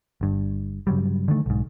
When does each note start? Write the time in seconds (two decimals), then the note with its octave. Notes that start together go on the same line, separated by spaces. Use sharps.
0.21 G1 G2
0.87 G2 C#3 F#3 G3
1.28 D3 D#3 A3
1.46 B1 G#2